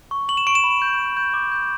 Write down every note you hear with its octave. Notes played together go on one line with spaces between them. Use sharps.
C#6
C#6 F#7
E7
C#6 D7
E7
B5
G6
G6
G6
D6
G6